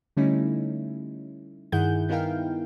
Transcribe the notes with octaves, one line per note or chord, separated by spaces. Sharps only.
D3 G3 A3 C#4 D#4 E4
G2 D#3 E4 G#4 F#5 G6
B3 D#4 E4 A#4 F5 G5